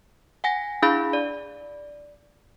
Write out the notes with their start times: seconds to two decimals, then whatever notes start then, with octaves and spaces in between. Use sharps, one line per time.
0.44 F#5 G#5 A#6
0.82 D4 E4 G#4 F5 B5
1.13 D5